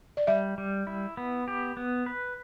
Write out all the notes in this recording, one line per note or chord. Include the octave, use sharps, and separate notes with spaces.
D5
G3 E5
G3
E4
B3
G4
B3
B4